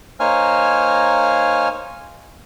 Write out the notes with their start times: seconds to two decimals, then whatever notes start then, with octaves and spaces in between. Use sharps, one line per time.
0.20 A#3 D#4 C5 C#5 G#5 F6